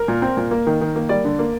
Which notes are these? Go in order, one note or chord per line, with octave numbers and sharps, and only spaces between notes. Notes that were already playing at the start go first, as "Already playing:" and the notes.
Already playing: A#4
A#2
C4
A#2
A#3
D#3
D#3
A#3
G3 D5
D3
A#3